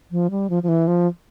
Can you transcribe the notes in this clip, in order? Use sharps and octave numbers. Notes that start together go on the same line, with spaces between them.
F3
G3
F3
F3
E3
F3